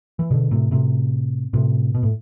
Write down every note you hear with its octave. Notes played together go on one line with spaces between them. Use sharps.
E3
B2 D3
A2 C3
A2 C3
A2 C3
B2
A2